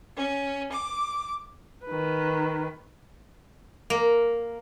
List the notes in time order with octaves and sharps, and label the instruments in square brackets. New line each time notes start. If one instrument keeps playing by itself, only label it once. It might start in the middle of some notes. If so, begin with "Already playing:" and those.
[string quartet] C#4
D6
[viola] D#3 B4
[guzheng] A#3